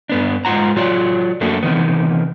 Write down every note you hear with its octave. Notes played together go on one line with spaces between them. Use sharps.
G2 B3 D4
G#2 C#3 F4 F#5 A#5
F#3 F4 C#5 D5
F#2 F#3 A3 A#3 D4
C3 D#3 E3 B3